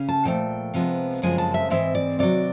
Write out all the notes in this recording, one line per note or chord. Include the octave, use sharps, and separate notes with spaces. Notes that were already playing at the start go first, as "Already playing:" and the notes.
Already playing: C#3 C#4
A5
A#2 F3 A3 G5
C3 F3 G#3 B3
F#2 C#3 F3 G#3 C4 G#5
A5
E5
G#2 E3 G#3 C4 E5
D5
C3 D#3 F#3 D5